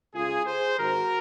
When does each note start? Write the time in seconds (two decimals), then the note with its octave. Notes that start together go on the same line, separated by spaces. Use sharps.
0.14 C#2 C#3 F4 G#4
0.46 G#4 C5
0.78 G#1 G#2 D#3 F#4 A#4